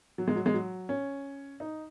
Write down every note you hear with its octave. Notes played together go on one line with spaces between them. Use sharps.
F#3
G#3
F#3
G#3
F#3
C#4
D#4